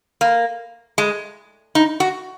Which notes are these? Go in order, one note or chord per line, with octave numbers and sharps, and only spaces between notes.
A#3
G#3
D#4
F#4